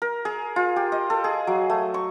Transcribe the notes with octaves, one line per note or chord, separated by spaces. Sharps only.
A#4
G#4
F4
G4
D#5
A4
G#4
F#3
A3
C#6